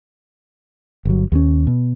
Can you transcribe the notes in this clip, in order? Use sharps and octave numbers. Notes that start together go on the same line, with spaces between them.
G1 F#3
D#2 G#3 C#4
B2